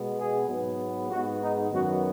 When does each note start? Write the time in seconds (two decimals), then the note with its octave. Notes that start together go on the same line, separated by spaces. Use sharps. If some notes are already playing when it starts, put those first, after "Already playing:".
Already playing: B2 G#3 B3
0.18 G#4
0.48 G#2 F#3 B3
1.09 G#2 G#3 B3 F#4
1.41 D#4
1.71 F#2 D#3 F#3 B3 F#4